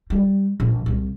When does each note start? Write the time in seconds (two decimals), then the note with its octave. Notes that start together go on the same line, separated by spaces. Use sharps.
0.10 G3
0.60 A#1
0.86 C2